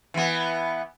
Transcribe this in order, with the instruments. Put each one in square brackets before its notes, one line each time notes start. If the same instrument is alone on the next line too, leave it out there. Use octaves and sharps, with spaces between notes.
[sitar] E3 B3